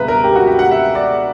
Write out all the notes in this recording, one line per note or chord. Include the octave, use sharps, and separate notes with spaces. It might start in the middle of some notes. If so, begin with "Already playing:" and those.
Already playing: C#2 B2 G3 B4 E5 A#5
A#4
G4
F#4
G4
F#5
E5
D5